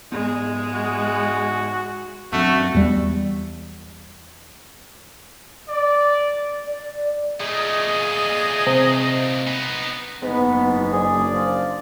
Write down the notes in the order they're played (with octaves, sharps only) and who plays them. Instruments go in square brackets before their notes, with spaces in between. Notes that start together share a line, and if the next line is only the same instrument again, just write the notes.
[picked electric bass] G#2 B3 [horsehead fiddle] G#3
[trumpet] F#4
[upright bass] F#2 [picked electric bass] A#2 C4 D4 [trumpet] A3 [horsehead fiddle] F#4
[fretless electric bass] E2 G3
[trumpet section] D5
[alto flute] D5
[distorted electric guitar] A#2 A3 [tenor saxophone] G#4 [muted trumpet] D#5
[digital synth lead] C3
[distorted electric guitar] B3 D#4
[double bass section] F#1 [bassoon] G#2 [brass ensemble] B3
[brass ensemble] F#2 D4 D5 [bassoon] G#4
[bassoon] F3